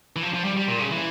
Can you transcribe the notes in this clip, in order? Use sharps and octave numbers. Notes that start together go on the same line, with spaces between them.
E3
F3
F3
G3
G3
A#2
C#3
E3